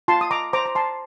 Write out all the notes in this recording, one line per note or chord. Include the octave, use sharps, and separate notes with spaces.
F4 A5 C6
D#6
A#5 D6
C5 A#5 D6
A#5
A5 C6